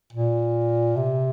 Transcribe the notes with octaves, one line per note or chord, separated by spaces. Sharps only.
A#2
C3